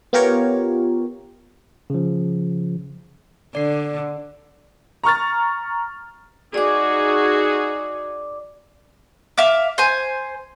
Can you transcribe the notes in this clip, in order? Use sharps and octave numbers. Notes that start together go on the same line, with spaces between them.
B3 F4 G4 A#4 C#5
C#3 F3
D3 D5 C7
A#5 C#6 F6 A6
D#4 F#4 G#4 D5 D6
E5 F5 D6
C5 G#5